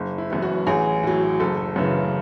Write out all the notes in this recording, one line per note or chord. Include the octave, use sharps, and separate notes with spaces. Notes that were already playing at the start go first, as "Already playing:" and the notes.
Already playing: F#1
E4
F#2 E3 B3
F#4
A1 G#4
A2 F#3
F#1 A4
F#2 C#3 E3